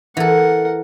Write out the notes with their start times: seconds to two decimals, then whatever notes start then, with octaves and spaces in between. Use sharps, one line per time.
0.17 E3 A4 A#4 F#5